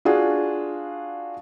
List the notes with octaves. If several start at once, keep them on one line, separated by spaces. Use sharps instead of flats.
D4 F4 F#4 G#4